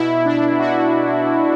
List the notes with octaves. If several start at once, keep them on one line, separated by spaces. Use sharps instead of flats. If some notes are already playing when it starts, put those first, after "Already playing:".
Already playing: B2 E4
D4
F#4